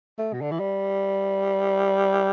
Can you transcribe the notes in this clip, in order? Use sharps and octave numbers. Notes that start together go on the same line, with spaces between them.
A3
B2
D3
E3
G3